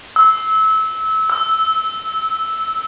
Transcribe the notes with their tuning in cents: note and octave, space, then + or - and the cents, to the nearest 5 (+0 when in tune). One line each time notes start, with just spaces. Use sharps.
E6 -25
E6 -5